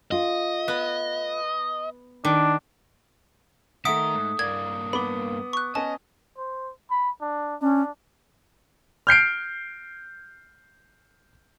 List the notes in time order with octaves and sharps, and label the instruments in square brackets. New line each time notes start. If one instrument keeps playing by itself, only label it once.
[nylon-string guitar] A3 F4 [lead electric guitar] D#5
[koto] B3
[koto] D#3 [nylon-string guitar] A3 [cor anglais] D4
[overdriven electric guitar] D#3 A#4 [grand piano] A3 E5 [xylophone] F#5 B6 D7 [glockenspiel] D#6
[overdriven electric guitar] G#2
[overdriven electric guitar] G2 A#3 [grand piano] D5 [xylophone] G#6
[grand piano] B3 D6 G7 [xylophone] B5
[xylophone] C#6 F#6
[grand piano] B3 C#4 [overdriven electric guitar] D#5 [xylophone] A5
[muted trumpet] C5
B5
D4
[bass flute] C#4 [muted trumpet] D4
[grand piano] F6 G6 C7 D7